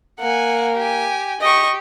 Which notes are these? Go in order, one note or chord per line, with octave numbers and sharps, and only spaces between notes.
A#3 F#5 G#5
G4 G#5
G4 D#5 C#6